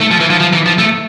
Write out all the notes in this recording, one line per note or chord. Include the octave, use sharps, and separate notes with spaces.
A3
F3
E3
F3
F3
E3
F3
A3